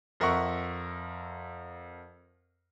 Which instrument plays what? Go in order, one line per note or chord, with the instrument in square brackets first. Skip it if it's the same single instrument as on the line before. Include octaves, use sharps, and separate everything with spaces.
[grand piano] F2 A#4 E5 F#5 C#6